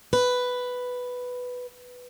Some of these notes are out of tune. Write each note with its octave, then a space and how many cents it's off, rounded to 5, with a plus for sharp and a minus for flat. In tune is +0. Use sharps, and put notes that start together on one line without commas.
B4 +5